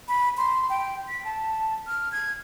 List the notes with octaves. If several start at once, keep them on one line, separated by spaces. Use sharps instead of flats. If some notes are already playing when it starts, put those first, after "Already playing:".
B5
C6
G5
B6
A5
F6
G#6